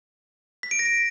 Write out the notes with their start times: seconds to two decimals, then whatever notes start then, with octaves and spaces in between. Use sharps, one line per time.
0.63 B6
0.71 D7
0.79 A#6